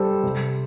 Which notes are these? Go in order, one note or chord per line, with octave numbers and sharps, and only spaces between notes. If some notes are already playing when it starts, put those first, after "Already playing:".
Already playing: G3 A4 C5
C3